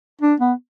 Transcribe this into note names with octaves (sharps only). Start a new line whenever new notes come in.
D4
B3